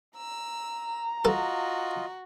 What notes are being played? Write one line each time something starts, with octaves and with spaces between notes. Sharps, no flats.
A#5 E6
F4 F#4 A4 D#5